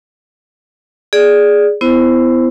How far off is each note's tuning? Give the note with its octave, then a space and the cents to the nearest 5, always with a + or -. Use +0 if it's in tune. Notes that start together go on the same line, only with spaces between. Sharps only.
G#4 +0 D5 +0
B3 +30 E4 +10 C5 +0